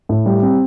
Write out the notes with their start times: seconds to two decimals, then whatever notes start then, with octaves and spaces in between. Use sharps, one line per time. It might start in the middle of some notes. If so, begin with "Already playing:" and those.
0.09 A2
0.26 G3
0.43 C4